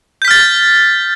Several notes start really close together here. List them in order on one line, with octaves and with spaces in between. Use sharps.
G6 B6 F6 A6